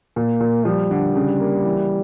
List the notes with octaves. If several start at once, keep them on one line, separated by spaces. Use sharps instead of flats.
A#2 A#3
A#2
F3 G3
D3
C#3
A#3
E3